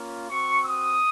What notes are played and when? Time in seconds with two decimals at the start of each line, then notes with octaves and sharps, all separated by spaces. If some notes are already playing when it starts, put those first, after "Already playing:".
Already playing: A#3 C#4 F4
0.30 C4 F#4 C#6
0.64 D#6